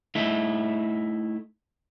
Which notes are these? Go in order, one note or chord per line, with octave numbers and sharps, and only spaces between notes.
A3 D#4 E4